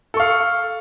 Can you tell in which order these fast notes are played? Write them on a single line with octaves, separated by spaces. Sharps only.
A4 C#6 F5